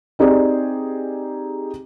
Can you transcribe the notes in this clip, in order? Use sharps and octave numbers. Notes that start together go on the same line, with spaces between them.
C4 D#4 G4 G#4 D5